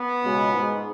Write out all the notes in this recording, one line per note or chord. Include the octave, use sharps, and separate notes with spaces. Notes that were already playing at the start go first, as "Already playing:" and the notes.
Already playing: B3
C#2 B2 G#3
G#2 G#3